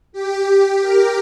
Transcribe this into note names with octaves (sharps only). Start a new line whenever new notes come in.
G4
A#4